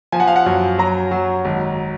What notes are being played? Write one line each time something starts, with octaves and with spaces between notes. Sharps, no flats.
F3 G#5
F#5
F5
F#5
F#2
F#3 A#5
F#3
G#1